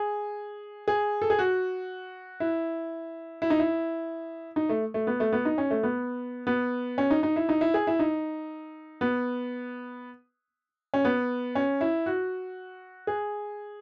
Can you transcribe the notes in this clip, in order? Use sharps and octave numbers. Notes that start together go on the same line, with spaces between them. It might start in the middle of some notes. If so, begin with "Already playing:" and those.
Already playing: G#4
G#4
A4
G#4
F#4
E4
E4
D#4
E4
D#4
A3
A3
B3
A3
B3
D#4
C#4
A3
B3
B3
C#4
D#4
D#4
E4
D#4
E4
G#4
E4
D#4
B3
C#4
B3
C#4
E4
F#4
G#4